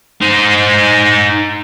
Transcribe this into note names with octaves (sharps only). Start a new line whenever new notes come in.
D#4 C5